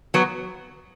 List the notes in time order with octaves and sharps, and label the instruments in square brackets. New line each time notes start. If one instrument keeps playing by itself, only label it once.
[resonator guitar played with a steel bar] F#3 B3